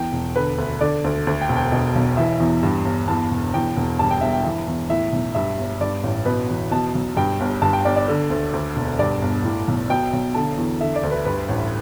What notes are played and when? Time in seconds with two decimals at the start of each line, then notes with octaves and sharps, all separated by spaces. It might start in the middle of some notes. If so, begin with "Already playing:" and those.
Already playing: E2 G5
0.13 E1
0.36 D3 B4
0.58 D2
0.81 D3 D5
1.04 D2
1.27 D2
1.41 G5
1.49 E1
1.57 G5
1.72 B2
1.95 B1
2.17 E3 E5
2.40 E2
2.63 G2
2.85 G1
3.08 E2 A5
3.31 E1
3.54 E2 G5
3.77 E1
3.99 G2 A5
4.11 G5
4.21 G1 E5
4.33 G5
4.44 E3 E5
4.67 E2
4.89 A2 E5
5.12 B1
5.35 G2 E5
5.58 G1
5.81 G2 D5
6.03 A1
6.25 B2 B4
6.49 E2
6.71 B2 A5
6.95 B1
7.17 G2 G5
7.40 G1
7.62 G2 A5
7.73 G5
7.85 G1 D5
7.96 D5
8.08 D3
8.30 D2
8.54 D2
8.76 E1
8.99 G2 D5
9.22 G1
9.44 A2
9.67 B1
9.89 B2 G5
10.13 B1
10.35 D3 A5
10.57 E2
10.81 D3 E5
10.96 D5
11.03 D2
11.11 B4
11.25 G2 B4
11.49 A1